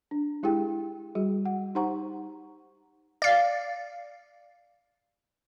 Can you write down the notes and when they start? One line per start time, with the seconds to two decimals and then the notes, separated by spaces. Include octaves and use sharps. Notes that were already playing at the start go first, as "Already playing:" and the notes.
0.11 D4
0.43 G#3 E4 G4 G#4 G5
1.15 G3 F#4 G#4
1.45 F#5
1.75 D#4 G4 C5 F#5 A#5 C#6
3.22 D5 F5